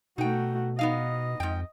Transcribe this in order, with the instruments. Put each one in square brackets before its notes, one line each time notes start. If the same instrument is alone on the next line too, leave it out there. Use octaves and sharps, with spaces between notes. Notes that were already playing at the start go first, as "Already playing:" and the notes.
[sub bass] B2 [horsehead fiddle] A3 F#4 [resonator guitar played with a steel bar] D#4 G5
[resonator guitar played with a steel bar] B3 D#4 F5 [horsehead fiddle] D#5
[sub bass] F2 [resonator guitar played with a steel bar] G#2 G5